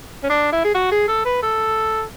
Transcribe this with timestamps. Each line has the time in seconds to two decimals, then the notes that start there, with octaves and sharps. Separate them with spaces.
0.23 C#4
0.30 D4
0.53 E4
0.64 G#4
0.75 F#4
0.92 G#4
1.08 A4
1.25 B4
1.43 A4